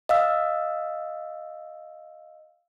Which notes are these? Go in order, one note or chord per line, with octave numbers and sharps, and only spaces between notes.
D#5 F5 E6